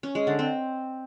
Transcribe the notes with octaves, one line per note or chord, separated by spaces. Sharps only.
C#4
G#3
D3
C4